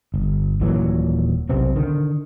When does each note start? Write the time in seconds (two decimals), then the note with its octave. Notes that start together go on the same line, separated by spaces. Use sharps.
0.14 G1
0.61 D#1 A#2 E3 F#3
1.50 B1 C3 B3 C4
1.76 D3 D#3